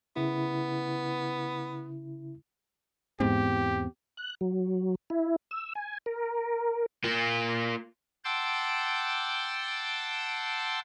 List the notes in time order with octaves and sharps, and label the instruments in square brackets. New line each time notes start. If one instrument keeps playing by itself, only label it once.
[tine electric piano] C#3 E4 [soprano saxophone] B3
[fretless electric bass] E2 B3 C4 [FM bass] G#2 [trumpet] G4
[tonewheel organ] F#6
F#3
E4
E6
G#5
A#4
[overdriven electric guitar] A#3 F4
[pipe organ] F#5 G5 A5 C6 D6 E6